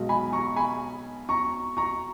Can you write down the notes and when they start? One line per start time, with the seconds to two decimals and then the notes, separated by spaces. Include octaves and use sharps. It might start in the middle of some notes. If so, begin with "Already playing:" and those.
Already playing: B1 B2 G#3
0.09 G#5 B5
0.33 A#5 C#6
0.56 G#5 B5
1.29 A#5 C#6
1.77 A#5 C#6